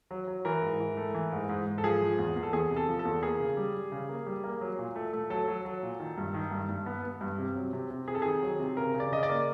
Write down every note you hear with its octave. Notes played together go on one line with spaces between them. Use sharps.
F#3
F#3
E3 A#4
G#2
E3
A3
E3
G#2
G#2
G#2
A4
F3 G#4
F3
E2
E2
A4
E2 G#4
C3
A4
F3
A4
E2
A#3 G#4
C#3
G3
G3
C#3
A#3
G3
A#3
F#3
A#2
A3
A3
F#3 A4
F#3
F#3
A#2
D#3
G2
D#3
G2
G2
B3
B3
G2
C3
F#3
C3
C3
C3 G#4
A4
D#3 G#4
F#3
C3
C#3 A#4
C#3
D5
C#3 D#5
D5
A#3